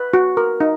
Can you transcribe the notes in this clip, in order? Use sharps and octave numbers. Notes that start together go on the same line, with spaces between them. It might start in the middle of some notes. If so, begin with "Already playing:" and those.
Already playing: B4
F#4
A#4
D#4